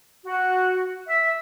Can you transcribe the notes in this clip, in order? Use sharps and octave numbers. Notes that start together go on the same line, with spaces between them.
F#4
E5